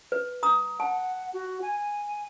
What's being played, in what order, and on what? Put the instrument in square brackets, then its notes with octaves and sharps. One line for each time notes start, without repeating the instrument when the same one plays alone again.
[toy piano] B4
A#5 D#6
[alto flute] F#5 [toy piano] A5
[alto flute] F#4
G#5